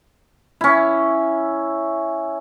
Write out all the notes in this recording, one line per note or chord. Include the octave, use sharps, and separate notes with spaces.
C#4 E4